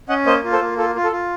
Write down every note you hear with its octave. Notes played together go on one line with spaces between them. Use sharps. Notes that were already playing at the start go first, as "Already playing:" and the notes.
C#4 D#5 F#5
A#3 C5 D#5
F4
A4 C5
A#3
F4 A4
F4
A4
F4